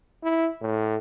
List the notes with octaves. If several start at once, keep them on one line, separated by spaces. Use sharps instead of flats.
E4
A2